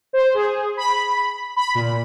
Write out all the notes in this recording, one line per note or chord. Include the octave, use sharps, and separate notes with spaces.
C5
G#4
B5
B5
A#2